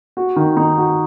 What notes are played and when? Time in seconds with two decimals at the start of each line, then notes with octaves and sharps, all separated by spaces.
0.17 F#4
0.36 D#3
0.57 D#4
0.78 F#4